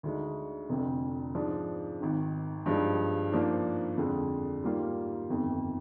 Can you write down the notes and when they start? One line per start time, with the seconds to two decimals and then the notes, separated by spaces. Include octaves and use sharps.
0.03 D2 D3 G#3 D#4
0.69 F1 F2 D3
1.35 G#2 F3 G#3 D4
2.01 G#1 G#2 D#3
2.66 G2 F3 G#3 D#4 G4
3.32 G#2 F3 A#3 D4
3.97 F2 D3 G#3
4.63 G#2 G3 A#3 F4
5.29 G1 F2 D#3